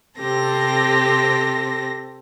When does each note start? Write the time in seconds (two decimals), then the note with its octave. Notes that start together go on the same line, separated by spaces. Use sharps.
0.19 C3 C4 G4 A4 A#6